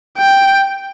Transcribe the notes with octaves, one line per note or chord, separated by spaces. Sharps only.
G5